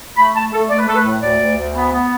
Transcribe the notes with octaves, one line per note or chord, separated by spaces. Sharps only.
A3 B5
A3 A5
A3 A4
A3 D5
B4
A3 A4
B4
A2
D2 D5
D2
D2
B3
B3